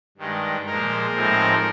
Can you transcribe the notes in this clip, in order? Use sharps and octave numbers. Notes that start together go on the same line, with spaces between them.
G2 D#3 G#3
A#2 F3 G#3 A#4
A2 F3 G#3 C4 D#4